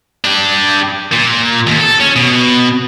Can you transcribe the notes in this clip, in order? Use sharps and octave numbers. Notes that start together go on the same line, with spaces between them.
D4 G4
A#2
D#2
A4
C#4
B2